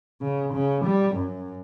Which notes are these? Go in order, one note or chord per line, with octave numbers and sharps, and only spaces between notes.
C#3
C#3
G3
F#2